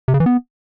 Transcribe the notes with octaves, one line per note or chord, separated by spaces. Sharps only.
C3
C#3
E3
B3